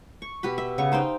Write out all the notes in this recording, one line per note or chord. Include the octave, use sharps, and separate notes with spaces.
C#6
B2 G4 B4 B5
E5
C#3 B3 C#5 C#6
D#4 C5 F5 G5